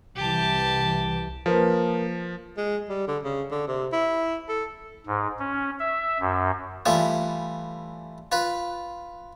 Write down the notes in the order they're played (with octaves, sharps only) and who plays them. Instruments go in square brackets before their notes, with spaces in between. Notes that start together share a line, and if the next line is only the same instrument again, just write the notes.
[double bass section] C2 E3 [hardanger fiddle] G4 A5
[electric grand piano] F3 [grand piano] A#3 A#4 B4
[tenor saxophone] G#3
G3
D3
C#3
D3
C3
E4
A4
[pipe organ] G#2
C#4
E5
F#2
[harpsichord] E3 G3 A3 F4
F4 B4